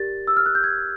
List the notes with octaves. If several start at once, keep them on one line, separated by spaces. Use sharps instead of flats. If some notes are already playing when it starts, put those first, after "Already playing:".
Already playing: G4 A#4 D5 A6
E6
F6
F#6
G6
G#6